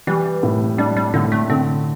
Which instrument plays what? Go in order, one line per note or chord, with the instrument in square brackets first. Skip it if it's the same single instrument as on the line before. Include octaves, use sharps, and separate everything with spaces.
[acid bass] E3 [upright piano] G3
[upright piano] A2
[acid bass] G3 [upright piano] D4
[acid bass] G3
[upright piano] A2 [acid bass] D3
[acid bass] A3
[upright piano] D3 [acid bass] C4